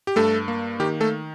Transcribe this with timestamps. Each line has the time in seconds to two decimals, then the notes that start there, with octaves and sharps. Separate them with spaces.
0.07 G4
0.16 G2 A3 A4
0.48 A#3
0.80 D#3 G4
1.00 A3 A4